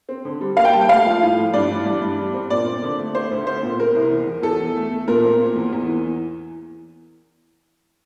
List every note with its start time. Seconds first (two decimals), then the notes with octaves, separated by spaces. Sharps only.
0.09 C4
0.25 D3
0.41 G3
0.57 A#3 F5
0.65 G5
0.73 G3 A5
0.81 G5
0.89 A3 F5
1.06 F3
1.22 A2
1.38 A2
1.53 G2 D5
1.70 E3
1.86 G2
2.01 G2
2.19 G3
2.34 C4
2.50 A#2 D5
2.66 C4
2.83 D3
2.98 A3
3.15 A3 C5
3.31 D2
3.47 C4 C5
3.63 A#2
3.79 C4 A#4
3.95 C2
4.12 E2
4.27 E2
4.43 E2 A4
4.60 E2
4.76 A3
4.92 A3
5.08 A#2 A#4
5.24 C4
5.41 A#3
5.56 E2
5.73 E2
5.88 E3